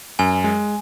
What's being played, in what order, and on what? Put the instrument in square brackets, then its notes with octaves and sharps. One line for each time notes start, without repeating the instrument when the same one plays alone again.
[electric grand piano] F#2 [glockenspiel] G#5
[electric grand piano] G#3